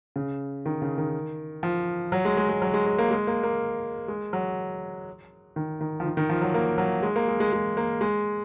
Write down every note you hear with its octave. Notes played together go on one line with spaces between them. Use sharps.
C#3
D#3
C#3
D#3
F3
F#3
G#3
G#3
G#3
F#3
G#3
G#3
A#3
G#3
A#3
A#3
G#3
F#3
D#3
D#3
F3
D#3
D#3
F3
F#3
A#3
F#3
G#3
A#3
G#3
G#3
G#3
A#3
G#3